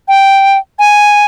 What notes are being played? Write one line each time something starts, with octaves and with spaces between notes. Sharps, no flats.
G5
G#5